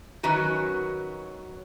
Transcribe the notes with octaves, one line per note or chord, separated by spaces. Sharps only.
D#3 F#3 C#4 F#4 B4 A#5